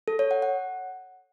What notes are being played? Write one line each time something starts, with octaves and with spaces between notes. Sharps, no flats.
A4
C#5
F#5
F#5